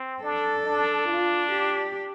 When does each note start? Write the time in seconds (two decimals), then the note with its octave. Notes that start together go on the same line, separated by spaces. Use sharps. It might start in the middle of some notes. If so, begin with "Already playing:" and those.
Already playing: C4
0.23 D4 A4
0.65 D4
1.09 F4
1.51 G4